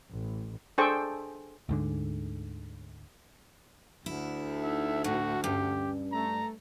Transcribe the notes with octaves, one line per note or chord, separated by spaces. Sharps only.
A1
D4 G#4 A4 C5 G5 C#6
D2 G#2 D3
D2 E4
D#4 E5
A2 F#4
G2 C#4 G4
A3 A#5